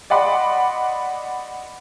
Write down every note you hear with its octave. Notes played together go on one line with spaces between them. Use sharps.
D5 D#5 F#5 B5 C6 D6